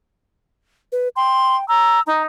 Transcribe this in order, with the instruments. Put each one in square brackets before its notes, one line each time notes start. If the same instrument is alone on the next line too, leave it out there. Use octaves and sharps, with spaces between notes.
[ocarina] B4
[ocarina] G5 [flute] C6
[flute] A#5 [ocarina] E6
[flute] D#4 [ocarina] A#5